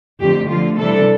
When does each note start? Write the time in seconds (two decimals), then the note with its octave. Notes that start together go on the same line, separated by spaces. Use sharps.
0.20 F2 D3 A3 C4 G4
0.48 D3 F3 A3 F4
0.78 C3 E3 G3 D4 A4